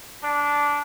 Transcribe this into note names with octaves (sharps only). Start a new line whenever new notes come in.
D4